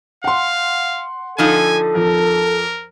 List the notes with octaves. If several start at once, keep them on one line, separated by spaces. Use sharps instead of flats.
F5 F#5 C6
D3 F3 D#4 A4 G#5
F2 A#4